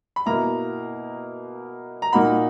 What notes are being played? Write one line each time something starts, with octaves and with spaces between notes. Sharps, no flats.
B5
B2 A#3 E4 A#5
A#5
A#2 A#3 D#4 F#4 B5